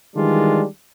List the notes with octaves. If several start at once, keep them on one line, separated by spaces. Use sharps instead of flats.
D#3 E3 G3 G#3 D4 F4